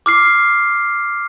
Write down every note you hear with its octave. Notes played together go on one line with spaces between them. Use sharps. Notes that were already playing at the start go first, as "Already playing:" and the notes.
D6 F6 C7